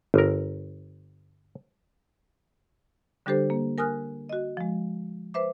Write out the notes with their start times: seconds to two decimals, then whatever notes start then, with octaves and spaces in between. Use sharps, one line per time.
0.14 G1 A#4
3.26 D3 G3 D4 G4 A4 C5
3.50 A#3
3.78 A#4 G#5 D#6 F6 F#6
4.29 F#4 D#5
4.57 F3 G#3
5.34 B4 C5 E5 D6